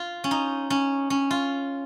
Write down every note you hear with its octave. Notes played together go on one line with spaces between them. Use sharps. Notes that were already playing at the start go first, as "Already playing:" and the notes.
Already playing: F4
C#4
D#4
C#4
C#4
F4